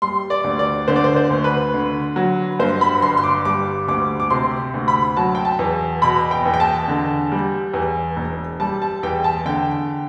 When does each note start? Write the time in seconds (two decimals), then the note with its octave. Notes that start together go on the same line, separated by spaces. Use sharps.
0.02 G3 C6
0.30 D5
0.44 D2
0.59 D5
0.88 D3 C5
0.96 D5
1.04 C5
1.16 C5
1.30 D2
1.44 B4
1.74 D3
2.16 F#3
2.59 G2 C5
2.81 B5
3.02 G1 C6
3.17 C6
3.24 D6
3.45 G3 D6
3.88 D2 D6
4.20 D6
4.30 C3 C6
4.74 D2
4.88 B5
5.17 F#3 A5
5.35 G5
5.45 A5
5.59 E2
6.02 B2 B5
6.31 G5
6.45 E2
6.54 G5
6.60 A5
6.88 D3
7.32 G3
7.74 E2
8.17 E1
8.60 G3 A5
8.82 A5
9.03 E2 G5
9.24 A5
9.46 D3 G5